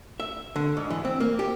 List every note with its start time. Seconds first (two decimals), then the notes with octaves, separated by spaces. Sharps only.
0.20 E5
0.56 D3
0.77 G#2
0.90 E3
1.05 C4
1.20 A#3
1.39 G4